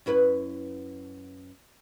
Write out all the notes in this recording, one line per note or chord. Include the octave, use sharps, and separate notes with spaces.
F#2 E4 B4